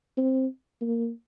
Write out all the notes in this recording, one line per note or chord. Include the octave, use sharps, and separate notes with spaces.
C4
A#3